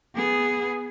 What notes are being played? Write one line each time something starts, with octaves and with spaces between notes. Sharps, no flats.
B3 G#4